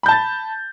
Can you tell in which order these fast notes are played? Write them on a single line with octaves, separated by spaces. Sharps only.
B5 G6 A5 A6